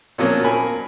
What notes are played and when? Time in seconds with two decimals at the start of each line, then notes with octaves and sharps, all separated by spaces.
0.18 A#2 F3 F#3 A#3 C#4
0.44 A#4 G#5 B5